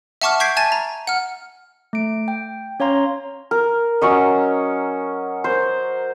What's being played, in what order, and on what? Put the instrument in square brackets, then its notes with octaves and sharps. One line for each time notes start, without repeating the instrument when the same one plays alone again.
[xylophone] E5 F#5 A5 C#6 D6 F6
C#6 G6 G#6 B6 C7 D7
E5 G#5 A5 G#6 A6 D#7
A#5
F#5 F6
[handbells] A3 D7
G5
C#4 C#5 F5 A#5 C6
[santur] A#4
F#3 C#4 C#5 D#5
A#4 C5